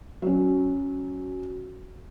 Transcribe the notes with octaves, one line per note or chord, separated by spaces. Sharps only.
F#3 C#4